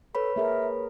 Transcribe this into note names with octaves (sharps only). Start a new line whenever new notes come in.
A4 B4 C#5 B5
A#3 G#4 A#4 E5